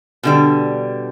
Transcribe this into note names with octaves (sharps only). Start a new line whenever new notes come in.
B2 D3 G3